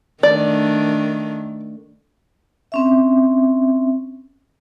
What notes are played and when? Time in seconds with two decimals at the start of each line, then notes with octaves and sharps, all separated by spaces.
0.23 D#3 A3 D4 D5
2.72 C4 C#4 E5